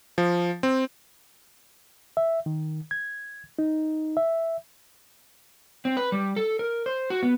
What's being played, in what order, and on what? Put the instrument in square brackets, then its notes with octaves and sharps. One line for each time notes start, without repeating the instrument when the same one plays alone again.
[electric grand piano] F3
C4
[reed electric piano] E5
D#3
G#6
D#4
E5
[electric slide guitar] C4
B4
G3
A4
A#4
C5
F#4
B3